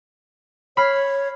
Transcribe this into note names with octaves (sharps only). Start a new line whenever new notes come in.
C#5 B5 F6 C7